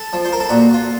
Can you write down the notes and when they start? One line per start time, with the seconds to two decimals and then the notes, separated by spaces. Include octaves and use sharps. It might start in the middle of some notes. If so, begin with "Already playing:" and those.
Already playing: A4
0.13 F3
0.25 C5
0.33 A#4
0.40 A4
0.49 A#2 F#4
0.73 F4